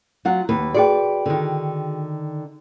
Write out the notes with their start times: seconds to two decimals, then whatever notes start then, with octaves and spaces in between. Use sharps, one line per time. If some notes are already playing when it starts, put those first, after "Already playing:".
0.25 F#3 F4 F#5
0.49 D#2 B4
0.74 F#4 G#4 B4 D5 G5
1.26 D3 D#3